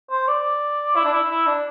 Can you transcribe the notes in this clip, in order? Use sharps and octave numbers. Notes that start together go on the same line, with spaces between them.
C5
D5
E4
D4
E4
E4
D4